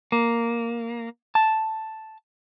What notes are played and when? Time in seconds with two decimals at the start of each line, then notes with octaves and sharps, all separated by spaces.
0.12 A#3
1.35 A5